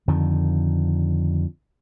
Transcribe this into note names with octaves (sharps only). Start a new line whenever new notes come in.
F2 D3 D#3 F3